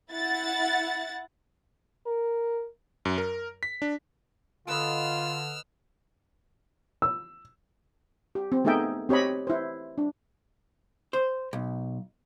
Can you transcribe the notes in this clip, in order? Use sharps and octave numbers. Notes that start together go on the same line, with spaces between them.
E4 F#5 A6
A#4
F#2
A#4
B6
D4
D3 F4 A4 B4 D#5 E6 F6
E6
G4
C4
A3 B3 D#4 G#4 E5 G5
C4 G4 C#5 D#5 B5
E4 C5
D4
C5
B1